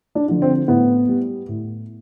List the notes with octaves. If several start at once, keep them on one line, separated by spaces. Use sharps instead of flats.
D4
D3 F3
C4
A2 B3
G3
A2